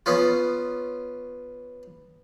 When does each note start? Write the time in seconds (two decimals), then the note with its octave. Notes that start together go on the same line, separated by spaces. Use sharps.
0.06 B3 C#4 F4